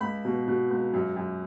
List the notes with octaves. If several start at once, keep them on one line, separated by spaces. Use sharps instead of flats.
C#2 B5
B2
B2
C#2
F#2
F#2